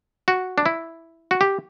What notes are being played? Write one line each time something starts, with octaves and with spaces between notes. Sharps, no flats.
F#4
D4
E4
F#4
G4